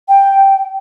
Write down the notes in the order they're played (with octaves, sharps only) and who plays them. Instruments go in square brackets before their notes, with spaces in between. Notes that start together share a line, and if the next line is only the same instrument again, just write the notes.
[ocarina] G5